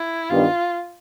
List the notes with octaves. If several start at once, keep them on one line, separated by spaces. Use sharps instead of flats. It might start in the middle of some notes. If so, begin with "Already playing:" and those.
Already playing: E4
G2 D#3 G3 B3 D4 F4